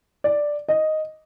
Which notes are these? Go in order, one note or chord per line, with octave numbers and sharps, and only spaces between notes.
D5
D#5